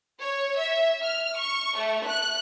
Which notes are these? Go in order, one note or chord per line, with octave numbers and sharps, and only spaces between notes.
C#5
E5
F6
C#6
A3
F#6